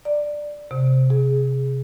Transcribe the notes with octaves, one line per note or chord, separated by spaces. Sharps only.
D5
C3
G#4